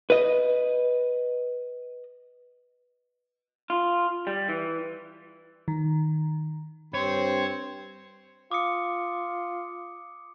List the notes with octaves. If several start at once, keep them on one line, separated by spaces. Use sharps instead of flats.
B4 D#5
F4
G3
E3
D#3
G2 C4 C5 C#5
F4 D6 D#6 C#7